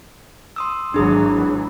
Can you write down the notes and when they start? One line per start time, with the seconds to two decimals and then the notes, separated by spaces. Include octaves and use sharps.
0.56 C6 D#6 E6
0.94 G#1 E3 F#3 D4 G#4 D#6